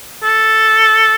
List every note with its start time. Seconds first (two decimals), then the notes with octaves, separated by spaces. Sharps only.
0.23 A4